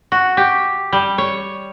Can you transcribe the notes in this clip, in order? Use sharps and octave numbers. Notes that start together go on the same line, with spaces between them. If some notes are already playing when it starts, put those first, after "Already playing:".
F#4
G4
G3
C#5